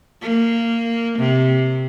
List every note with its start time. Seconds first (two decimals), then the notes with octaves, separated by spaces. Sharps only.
0.21 A#3
1.19 C3